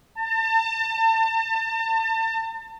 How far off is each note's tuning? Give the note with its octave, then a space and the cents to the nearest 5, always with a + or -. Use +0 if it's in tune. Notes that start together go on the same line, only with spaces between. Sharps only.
A5 +35